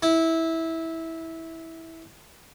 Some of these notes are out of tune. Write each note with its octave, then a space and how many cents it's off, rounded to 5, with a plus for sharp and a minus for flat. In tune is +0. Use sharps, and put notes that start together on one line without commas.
E4 -15